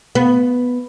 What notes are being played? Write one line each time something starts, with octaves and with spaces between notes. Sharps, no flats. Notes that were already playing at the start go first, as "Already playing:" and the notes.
B3